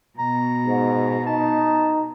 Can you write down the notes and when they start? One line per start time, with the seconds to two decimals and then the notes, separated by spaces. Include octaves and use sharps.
0.19 B2 A#5
0.66 G#2
1.27 D#4 A5